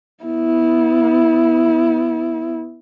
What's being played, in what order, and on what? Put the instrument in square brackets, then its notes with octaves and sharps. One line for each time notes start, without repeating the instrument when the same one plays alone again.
[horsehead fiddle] B3 E4